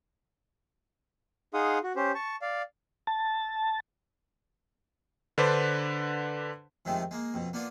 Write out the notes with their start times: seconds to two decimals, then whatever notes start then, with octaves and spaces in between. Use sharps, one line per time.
1.54 D#4 G#4 F5 F#5 C6 D#6
1.84 F#4
1.96 C#4 G4 C5
2.15 A5 C#6
2.42 D5 F5
3.07 A5
5.38 D3 D4 B4 C5 D5
6.85 F2 C3 D#3 G#3 A3
7.11 G#3 A#3
7.34 F2 B2
7.53 A#3 B3 D4 F4